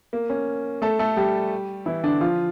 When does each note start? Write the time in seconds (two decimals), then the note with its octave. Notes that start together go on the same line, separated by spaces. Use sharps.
0.13 A#3
0.30 C#4
0.82 A3 A4
0.99 A3 A4
1.17 G3 G4
1.86 E3 E4
2.03 D3 D4
2.21 F3 F4